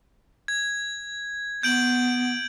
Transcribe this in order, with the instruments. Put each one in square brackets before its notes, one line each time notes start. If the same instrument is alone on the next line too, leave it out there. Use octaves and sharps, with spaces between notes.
[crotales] G#6
[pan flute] B3 [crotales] G6 D7 F#7